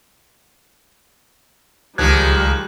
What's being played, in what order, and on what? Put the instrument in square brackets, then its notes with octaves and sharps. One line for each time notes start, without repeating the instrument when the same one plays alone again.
[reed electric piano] C#2 G#6 [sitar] D#3 F3 [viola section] G3 G#3 [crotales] F#6